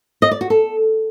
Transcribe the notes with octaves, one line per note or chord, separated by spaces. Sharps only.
D#5
D5
F#4
A4